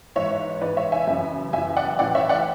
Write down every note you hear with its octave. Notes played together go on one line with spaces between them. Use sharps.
G#2 E3 C#5 E5
G#2 E3 B4 D5
C#5 E5
E5 G#5
F#2 C#3 E3
F#2 C#3 E3 E5 G#5
D5 F#5
A2 E3 D5 F#5
C#5 E5
D5 F#5